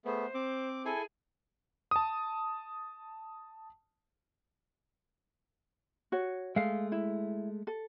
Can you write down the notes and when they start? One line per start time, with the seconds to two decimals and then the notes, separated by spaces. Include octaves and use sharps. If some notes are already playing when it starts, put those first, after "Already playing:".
0.05 A3 B3 G#4 C5
0.34 C4 D6
0.85 E4 G#4 A4 G#5
1.91 A5 D#6
6.12 F#4 C#5
6.56 G#3 A3 F5
6.92 E4
7.67 A4